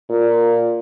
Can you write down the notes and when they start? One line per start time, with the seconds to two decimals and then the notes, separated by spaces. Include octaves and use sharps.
0.10 A#2